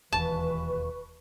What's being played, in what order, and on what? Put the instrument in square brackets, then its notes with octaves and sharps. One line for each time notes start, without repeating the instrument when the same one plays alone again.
[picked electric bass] E1 D#2 [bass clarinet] E3 [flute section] B4 C#6 [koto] A5